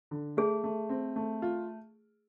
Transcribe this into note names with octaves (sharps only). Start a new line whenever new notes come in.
D3
A3 G#4
A3
C4
A3
F4